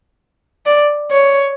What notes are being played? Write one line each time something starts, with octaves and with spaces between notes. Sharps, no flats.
D5
C#5